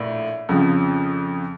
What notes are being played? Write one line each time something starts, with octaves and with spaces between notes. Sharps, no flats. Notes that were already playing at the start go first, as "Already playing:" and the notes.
Already playing: A#1 A2
F2 C#3 F3